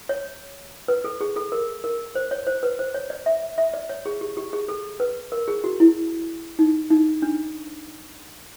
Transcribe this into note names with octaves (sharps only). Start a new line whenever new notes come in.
C#5
B4
A4
G#4
A4
A#4
A#4
C5
C#5
C5
B4
C5
C#5
D5
E5
E5
D5
C#5
G#4
G4
G4
G#4
A4
B4
A#4
G#4
F#4
E4
D#4
D#4
D4